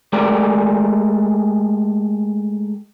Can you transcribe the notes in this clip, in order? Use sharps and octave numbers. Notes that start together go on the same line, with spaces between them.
G#3 A3 G4 A#4 D5